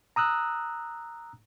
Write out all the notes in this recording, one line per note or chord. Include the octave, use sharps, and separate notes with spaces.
A#5 D#6 E6 F#6